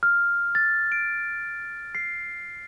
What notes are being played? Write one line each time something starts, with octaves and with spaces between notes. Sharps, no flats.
F6
A6
D7
C7